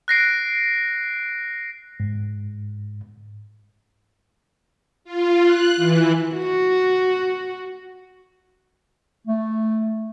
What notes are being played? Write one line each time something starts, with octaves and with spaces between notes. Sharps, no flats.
F#6 A#6 C7 D7
G#2
F4
F#6
E3
F#4
A3